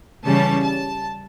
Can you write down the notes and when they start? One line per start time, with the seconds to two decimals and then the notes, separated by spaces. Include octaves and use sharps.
0.25 C#3 E3 G3 C#4 A5
0.64 A5